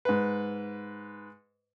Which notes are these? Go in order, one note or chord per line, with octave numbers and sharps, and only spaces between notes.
G#2 B4